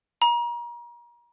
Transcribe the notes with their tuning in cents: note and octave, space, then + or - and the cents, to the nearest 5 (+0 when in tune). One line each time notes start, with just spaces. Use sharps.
A#5 +35